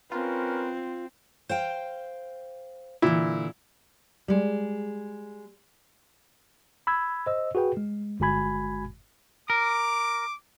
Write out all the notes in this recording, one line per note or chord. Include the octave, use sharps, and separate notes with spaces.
C4 C#4 F4 A#4 B4
C5 F5 G5
A#2 D3 E3 E4
G3 G#3
B5 E6 G#6
C5 D#5 E6
F#4 G#4 B4 G5
G#3
G1 G#3 F#4 G#5 B5 G#6
A#4 D6